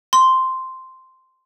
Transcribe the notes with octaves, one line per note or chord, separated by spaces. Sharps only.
C6